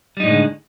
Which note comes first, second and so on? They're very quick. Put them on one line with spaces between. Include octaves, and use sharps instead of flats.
G3 D#4 A2 G#3 D3